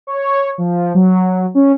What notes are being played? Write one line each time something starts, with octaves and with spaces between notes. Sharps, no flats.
C#5
F3
F#3
C#4